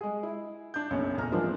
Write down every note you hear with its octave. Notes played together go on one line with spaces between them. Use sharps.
G#3 G#4
E4
D4 G6
F#1 B1 F#2 C#5
D#1 E2 A#5 F6
G#2 E3 F3 A#3 C4 D4